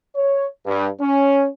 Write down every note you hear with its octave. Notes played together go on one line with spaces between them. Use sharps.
C#5
G2
C#4